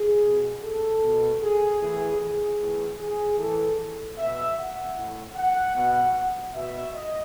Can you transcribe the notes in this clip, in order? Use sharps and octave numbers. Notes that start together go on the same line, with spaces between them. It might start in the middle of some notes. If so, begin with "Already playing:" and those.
Already playing: G#4
B2
A4
B2
G#4
A2 E3 G#4
G#4
A2 E3
G#4
A2 E3 A4
B2 E5
F#5
A2 E3
F#5
B2 F#5
B2 E5
D#5